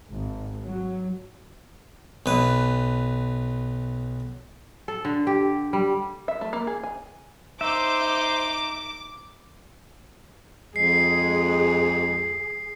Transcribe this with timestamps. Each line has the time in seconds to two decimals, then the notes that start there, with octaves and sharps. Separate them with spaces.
0.12 G#1
0.63 F#3
2.26 B1 B4
4.88 A4
5.05 D3
5.27 G4
5.73 G3
6.28 E5
6.41 A3
6.53 A#3
6.67 G#4
6.83 G#5
7.61 D#4 C5 E5 D6
10.76 F2 G#3 G#4 C7